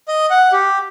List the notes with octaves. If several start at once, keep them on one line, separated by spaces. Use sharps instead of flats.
D#5
F#5
G4